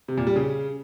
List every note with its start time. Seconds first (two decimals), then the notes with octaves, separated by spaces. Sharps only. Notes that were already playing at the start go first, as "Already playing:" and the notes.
0.08 C3
0.18 A#2
0.27 G3
0.36 C#3